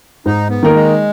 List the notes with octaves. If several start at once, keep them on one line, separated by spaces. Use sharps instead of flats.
G#2 D#4
B3
D#3 A#3 D#4 A#4
G#3